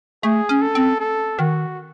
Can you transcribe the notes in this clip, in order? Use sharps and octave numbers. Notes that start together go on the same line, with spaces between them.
A3 G#4
C#4
A4
C4
A4
D#3 F#4